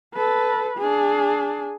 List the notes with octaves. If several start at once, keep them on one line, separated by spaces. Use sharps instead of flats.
A4 B4
D4 G#4